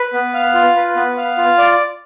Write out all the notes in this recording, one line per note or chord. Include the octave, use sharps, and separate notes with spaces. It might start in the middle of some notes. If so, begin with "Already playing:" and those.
Already playing: B4
B3
F5
F4
B4
B3
F5
F4
D5